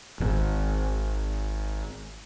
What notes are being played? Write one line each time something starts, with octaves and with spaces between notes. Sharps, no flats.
D1 G#1